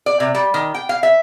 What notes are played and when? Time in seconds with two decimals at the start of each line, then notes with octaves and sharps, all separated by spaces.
0.06 D5
0.20 C3
0.35 G3
0.54 D#3
0.74 G5
0.89 F5
1.03 E5